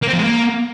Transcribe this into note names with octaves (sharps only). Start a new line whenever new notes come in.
A#3
C4
F3
G#3
A#3